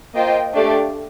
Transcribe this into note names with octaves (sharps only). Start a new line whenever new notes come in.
A#3 F4 C5 D#5 G5
A3 D4 G4 D5 F5